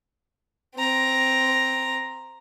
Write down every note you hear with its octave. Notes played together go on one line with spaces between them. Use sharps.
C4 A#5